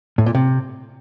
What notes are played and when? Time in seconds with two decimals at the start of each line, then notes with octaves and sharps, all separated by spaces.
0.18 A2
0.26 A#2
0.35 C3